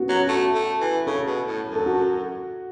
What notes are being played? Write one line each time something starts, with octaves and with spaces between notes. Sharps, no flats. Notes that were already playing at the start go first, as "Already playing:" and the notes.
Already playing: B3 C#4 F#4
F#3
A3 F#4
A3
E3
C#3 A4
B2
A2
F#2
A4
F#4